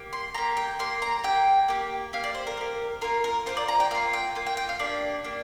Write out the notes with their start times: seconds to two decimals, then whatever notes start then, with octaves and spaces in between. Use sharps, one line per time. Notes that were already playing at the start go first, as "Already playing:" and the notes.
Already playing: A#3 G4
0.13 C6
0.34 A#3 G4 A#5
0.57 G5
0.79 A#3 G4 C6
1.02 A#5
1.24 A#3 G4 G5
1.68 A#3 G4
2.13 A#3 G4 F5
2.24 D5
2.35 C5
2.47 A#4
2.57 A#3 G4
3.01 A#3 F4 A#4
3.24 A#4
3.46 A#3 F4 C5
3.57 D5
3.68 A#5
3.80 G5
3.91 A#3 F4 F5
4.13 G5
4.35 A#3 F4
4.46 G5
4.57 G5
4.69 F5
4.79 A#3 D4 G4 D5
5.24 A#3 D4 G4